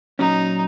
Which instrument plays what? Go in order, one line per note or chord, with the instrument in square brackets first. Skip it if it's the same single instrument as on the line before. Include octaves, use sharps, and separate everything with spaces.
[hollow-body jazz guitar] A#2 F#3 C#4 [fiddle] D#4